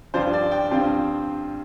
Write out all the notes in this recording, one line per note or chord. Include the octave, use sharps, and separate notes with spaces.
G2 F3 D4 F4 C5
D5
G5
G2 F3 C4 F4